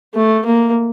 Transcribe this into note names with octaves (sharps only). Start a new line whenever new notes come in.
A3
A#3